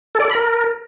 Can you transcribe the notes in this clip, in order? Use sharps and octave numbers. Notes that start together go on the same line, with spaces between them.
A4
D5
A4
B5
A#4